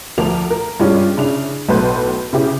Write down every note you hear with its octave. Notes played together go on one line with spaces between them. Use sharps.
D2 F3 A#4 D6 F7
A#4
G2 G#3 C#4 F4 G4
C#3 D4 E4 F7
B1 A2 A4 B4 C6 G6
C#3 E4 G4